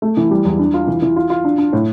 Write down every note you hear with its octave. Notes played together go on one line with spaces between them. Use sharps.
A3
E3
G3
E2
D4
F4
E3
E3
F4
F4
D4
D4
A2